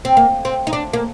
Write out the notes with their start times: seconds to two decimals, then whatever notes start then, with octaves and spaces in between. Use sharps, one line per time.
0.05 C4
0.17 A#3
0.45 C4
0.67 D#4
0.73 D4
0.93 A#3